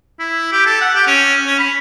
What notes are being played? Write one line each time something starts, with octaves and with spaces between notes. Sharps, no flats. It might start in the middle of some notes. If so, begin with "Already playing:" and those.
E4
G4
A4
F#5
G4
C#4
C#4
B5